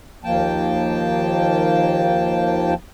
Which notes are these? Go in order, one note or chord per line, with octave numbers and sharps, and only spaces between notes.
D#2 F3 A#3 G5 A5